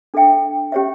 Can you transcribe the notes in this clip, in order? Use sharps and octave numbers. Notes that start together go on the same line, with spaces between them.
D4 A4 E5 G5
C#4 G4 C#5 E5